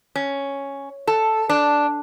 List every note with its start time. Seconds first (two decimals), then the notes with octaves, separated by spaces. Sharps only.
0.15 C#4
1.07 A4
1.49 D4